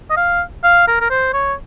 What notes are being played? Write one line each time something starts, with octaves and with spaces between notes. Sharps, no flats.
D#5
F5
F5
A#4
A#4
C5
C#5